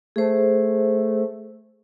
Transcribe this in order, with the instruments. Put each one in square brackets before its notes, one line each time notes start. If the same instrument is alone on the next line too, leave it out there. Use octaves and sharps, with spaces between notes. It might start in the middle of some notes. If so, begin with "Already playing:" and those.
[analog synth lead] A3 [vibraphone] G#4 C5